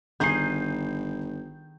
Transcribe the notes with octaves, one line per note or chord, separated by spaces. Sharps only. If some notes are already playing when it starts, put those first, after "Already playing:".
G1 D#3 G#4 D#5 G6 C7